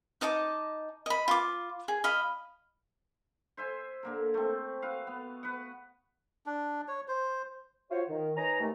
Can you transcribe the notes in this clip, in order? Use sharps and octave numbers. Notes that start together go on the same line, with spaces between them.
D#4 D#5 A5 D6
D#5 B5
F4 D6
G#4
D#5 F5 B5
C5 E5 G#5 C6
D3 A#3 A#4
A3 C4
F#4 B4 F5
B3
B4 F#5
D4
C#5
C5
F4 F#4 C5 C#5
D#3
D#4 B4 C#5 G#5 A#5
D#2 A3